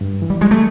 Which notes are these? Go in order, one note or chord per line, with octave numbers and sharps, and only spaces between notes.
G2
E3
G3
G3 G#3
A3